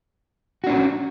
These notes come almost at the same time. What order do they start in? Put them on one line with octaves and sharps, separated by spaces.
F#4 D4 C#4